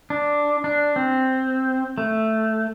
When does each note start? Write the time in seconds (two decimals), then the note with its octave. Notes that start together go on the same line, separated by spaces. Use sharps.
0.10 D4
0.64 D4
0.96 C4
1.98 A3